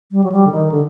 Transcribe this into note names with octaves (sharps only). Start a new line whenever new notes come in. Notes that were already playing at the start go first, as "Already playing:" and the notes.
G3
F#3
G3
D3
D#3
D3